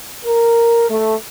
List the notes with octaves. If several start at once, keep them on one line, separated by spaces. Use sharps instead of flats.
A#4
A3